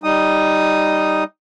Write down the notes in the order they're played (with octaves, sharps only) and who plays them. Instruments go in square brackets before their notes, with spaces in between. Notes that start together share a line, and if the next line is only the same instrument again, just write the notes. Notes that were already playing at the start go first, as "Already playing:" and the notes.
[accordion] G3 D#4 D#6